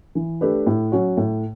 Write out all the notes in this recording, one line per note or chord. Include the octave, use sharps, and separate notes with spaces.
E3
A3 D4 G4 B4
A2
F#3 C#4 F#4
A2